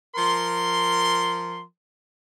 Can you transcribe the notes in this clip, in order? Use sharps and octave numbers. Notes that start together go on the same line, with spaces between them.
F3 A#4 C6